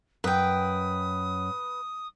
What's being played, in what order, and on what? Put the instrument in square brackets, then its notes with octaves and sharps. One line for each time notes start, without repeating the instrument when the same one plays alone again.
[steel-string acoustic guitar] F#2 [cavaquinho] B4 G5 [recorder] D#6